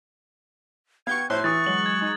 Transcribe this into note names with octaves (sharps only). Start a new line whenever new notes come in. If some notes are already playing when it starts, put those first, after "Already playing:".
B3 F5 G5 C#6 G#6
A2 C5 C6 F#6 G#6 C7
E3 E4 C#6 D#6 A6
F#3 G#3 F#7
G#6
G#3 D#4